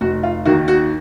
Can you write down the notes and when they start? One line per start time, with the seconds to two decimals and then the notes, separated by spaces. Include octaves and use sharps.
0.01 F1 F#4
0.23 F4
0.45 D#2 D#3 A#3 F#4
0.68 F#4